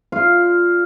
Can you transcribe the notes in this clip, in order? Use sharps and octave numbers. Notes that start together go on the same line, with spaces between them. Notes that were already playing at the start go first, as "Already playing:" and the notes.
F4 D5 F5